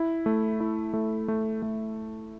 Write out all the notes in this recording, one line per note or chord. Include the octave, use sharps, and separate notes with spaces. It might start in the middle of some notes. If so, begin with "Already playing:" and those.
Already playing: E4
A3
E4
A3
A3
A3